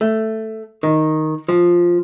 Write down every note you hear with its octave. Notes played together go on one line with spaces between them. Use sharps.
A3
D#3
F3